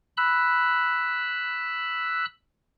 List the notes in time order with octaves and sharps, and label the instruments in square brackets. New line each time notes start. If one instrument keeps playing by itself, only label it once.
[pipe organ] B5 E6 F#6